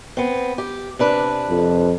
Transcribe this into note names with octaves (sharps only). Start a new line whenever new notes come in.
B3 C4
G4
C3 D4 B4
F2